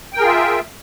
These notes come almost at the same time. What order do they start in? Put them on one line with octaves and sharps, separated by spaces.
G5 A#4 G#4 F4 E5